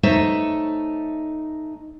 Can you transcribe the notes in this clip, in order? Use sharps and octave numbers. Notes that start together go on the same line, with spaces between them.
A3 D#4 C5 C#5 D#5 E5